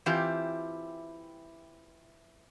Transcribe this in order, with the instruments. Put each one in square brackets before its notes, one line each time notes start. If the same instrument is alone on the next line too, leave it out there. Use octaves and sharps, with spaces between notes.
[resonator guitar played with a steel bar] E3 C4 E4 F4 G4